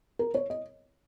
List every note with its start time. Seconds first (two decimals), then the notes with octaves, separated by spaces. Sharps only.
0.19 A#4
0.34 C#5
0.50 D#5